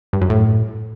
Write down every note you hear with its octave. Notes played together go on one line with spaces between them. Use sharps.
G2
F#2
A2